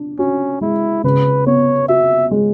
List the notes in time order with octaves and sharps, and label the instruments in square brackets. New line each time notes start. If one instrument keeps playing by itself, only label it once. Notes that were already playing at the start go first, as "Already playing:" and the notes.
Already playing: [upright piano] D4
[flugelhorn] C#4 [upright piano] F#4
[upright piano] G#3 [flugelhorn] E4
[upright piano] C#3 [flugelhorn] B4
[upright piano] B3 [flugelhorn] C#5
[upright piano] F#4 [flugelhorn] E5
[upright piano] G#3